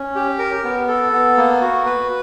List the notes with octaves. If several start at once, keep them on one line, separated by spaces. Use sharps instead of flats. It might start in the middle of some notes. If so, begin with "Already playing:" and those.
Already playing: C#4
G4
A#4
B3
A4
B3
A#3
F#4
B4